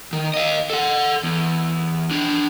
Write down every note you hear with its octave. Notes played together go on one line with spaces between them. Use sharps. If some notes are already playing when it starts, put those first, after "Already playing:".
D#3
D#5 F5
A4 F#5
E2
D4 G#4